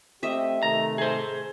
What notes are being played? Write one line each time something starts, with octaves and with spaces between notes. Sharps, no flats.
A3 C4 G4 D#5 E5
C3 D#3 A3 A#5
G#4 C5